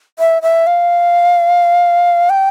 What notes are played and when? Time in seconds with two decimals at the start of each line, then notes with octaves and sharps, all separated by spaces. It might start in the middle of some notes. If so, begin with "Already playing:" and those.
0.19 E5
0.42 E5
0.67 F5
2.30 G5